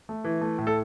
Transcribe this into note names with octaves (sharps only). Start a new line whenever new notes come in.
A3
E3
A3
A2
A4